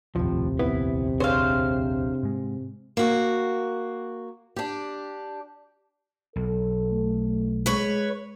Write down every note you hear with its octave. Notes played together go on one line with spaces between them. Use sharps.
F1 A#1 D#2 A2 C3 F3
B3 E4 B4
D4 G#4 C5 C#5 F5
G#2 G#3
A#3 F#4
D4 G4
B1 A4
A3
G#3 B4 C#5